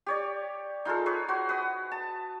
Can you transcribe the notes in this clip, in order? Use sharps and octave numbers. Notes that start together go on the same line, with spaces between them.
G4 C#5 D5
D#4 F4 G#4 A4
G#4 B4 C#5
F#4 C5
B4 D#6
A5